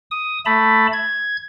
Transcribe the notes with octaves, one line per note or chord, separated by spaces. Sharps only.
D#6
A3 A5 B5
G#6